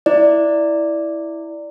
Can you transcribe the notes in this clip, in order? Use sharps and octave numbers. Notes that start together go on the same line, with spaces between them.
E4 D5